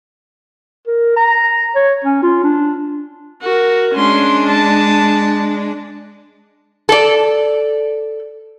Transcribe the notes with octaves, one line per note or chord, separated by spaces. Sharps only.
A#4
A#5
C#5
C#4
F4
D4
F#4 A#4
G#3 C#4 D4 C6
A5
A4 D5